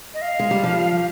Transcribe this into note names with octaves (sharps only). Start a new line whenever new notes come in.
D#5
F5
G#3
G3
F3